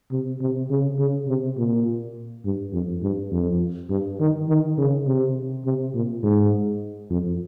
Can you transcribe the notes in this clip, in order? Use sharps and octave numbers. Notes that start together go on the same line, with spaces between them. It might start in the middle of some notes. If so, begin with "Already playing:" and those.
C3
C3
C#3
C#3
C3
A#2
G2
F2
G2
F2
G2
D#3
D#3
C#3
C3
C3
A#2
G#2
F2